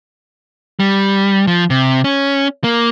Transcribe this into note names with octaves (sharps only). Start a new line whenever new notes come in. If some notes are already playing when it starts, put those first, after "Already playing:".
G3
F3
C3
C#4
A#3